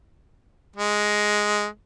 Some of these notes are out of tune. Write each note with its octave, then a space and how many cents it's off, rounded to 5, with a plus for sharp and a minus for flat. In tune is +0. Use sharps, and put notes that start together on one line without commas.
G#3 +5